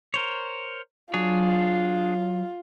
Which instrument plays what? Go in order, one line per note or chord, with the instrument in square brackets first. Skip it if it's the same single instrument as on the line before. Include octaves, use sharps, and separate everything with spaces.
[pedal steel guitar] A#4 C5 C#5
[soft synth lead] F#3 [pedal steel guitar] D4 G#4 C#5 [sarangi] F4